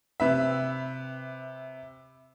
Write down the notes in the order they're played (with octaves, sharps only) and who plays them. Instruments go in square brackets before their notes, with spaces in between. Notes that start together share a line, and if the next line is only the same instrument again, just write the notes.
[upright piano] C3 B4 E5